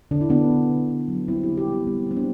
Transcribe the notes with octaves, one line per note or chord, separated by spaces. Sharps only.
D3 D4
E4
D3 B3 D4
D3
D3
D3
F#3
G3 C4 E4
E4 G4
D3
E4 G4
G3 B3
G3 C4
G3 C4
B3 D4